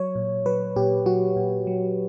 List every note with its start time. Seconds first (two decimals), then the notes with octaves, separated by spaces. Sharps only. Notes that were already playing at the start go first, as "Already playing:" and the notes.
Already playing: F#3 C#5
0.15 A#2
0.46 F#3 B4
0.76 A#2 G4
1.06 F#3 F#4
1.36 A#2
1.67 F#3